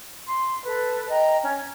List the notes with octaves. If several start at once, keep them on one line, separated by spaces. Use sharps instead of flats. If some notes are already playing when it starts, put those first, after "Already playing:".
C6
A4 B4
D#5 G5 A#5
C#4